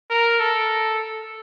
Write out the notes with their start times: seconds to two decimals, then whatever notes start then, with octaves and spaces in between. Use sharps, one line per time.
0.10 A#4
0.40 A4